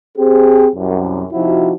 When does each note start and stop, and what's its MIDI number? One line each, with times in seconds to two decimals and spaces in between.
0.18 0.68 60
0.18 0.68 67
0.18 0.68 68
0.75 1.25 36
0.75 1.25 42
1.32 1.73 48
1.32 1.73 53
1.32 1.73 63
1.32 1.73 64
1.32 1.73 66